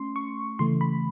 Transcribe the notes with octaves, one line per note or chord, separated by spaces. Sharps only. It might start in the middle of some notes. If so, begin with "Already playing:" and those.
Already playing: A3 C#4 C6
C#6
C#3 E3 A3 C6
B5